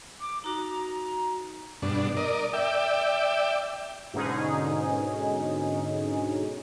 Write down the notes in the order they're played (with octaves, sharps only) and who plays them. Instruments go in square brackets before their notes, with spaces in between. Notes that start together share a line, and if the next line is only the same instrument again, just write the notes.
[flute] D6
[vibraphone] D#4 F#4 [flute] A#5
[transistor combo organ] G2 B2 D4
A#4 D5 D#5
D5 E5 G5
[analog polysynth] G#2 B2 D3 C#4 D#4 G#4